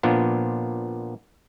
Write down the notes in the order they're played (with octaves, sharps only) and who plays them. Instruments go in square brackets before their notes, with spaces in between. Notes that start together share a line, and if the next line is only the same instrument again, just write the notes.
[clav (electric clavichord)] A#2 F3 B3 D4